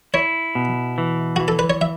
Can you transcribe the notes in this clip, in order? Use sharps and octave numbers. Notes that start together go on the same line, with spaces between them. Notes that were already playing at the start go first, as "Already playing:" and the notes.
E4 C#5
B2
E3
E3 F#4
A4
B4
C#5
E5